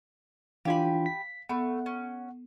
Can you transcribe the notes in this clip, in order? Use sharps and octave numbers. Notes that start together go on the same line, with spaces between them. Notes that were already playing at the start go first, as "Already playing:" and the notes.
E3 D4 F4 G4 F5 G#5 B5
B6
A3 B3 F#5 B5
C#4